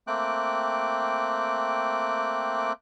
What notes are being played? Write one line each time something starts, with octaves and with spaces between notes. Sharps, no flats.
A3 A#3 C4 G5 D6 F#6